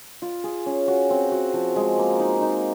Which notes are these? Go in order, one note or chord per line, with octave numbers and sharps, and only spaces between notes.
F4
G#4
C#4
F#4
C4
F#4
F3
G#3
A#3
D#4
D#4